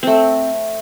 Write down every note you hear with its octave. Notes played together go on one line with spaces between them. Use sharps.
A3 C4